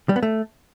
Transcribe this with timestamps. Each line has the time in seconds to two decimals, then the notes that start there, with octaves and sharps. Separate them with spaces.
0.09 G3
0.16 B3
0.23 A3